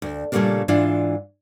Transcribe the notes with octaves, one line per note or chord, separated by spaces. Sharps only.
D2
A#2 C#3 G3 A3 A#3 D4
G#2 E3 D4 F4